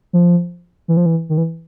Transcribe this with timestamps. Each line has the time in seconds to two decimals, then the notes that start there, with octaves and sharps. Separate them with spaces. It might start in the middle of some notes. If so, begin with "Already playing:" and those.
0.13 F3
0.88 E3
0.97 F3
1.06 E3
1.29 D#3
1.38 E3